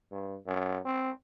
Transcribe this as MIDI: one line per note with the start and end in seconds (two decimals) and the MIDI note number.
0.12 0.36 43
0.46 0.79 42
0.85 1.11 60